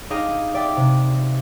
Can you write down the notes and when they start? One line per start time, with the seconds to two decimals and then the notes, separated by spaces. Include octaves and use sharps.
0.10 D#4 G4 G#4 D#5 F5
0.54 D5 E5 G5
0.77 C3